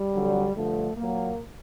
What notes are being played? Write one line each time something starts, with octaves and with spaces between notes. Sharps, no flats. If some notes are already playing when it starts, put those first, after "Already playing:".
Already playing: G3
F2 D3 F#3
G2 D3 F3 A3
A#2 F#3 A#3